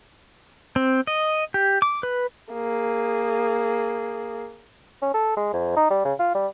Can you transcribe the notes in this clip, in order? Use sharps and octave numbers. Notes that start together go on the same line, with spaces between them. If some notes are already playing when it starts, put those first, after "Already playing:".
C4
D#5
G4
D6
B4
A#3 G#4
C#4
A4
G#3
F2
D#4
G3
C#3
F4
G3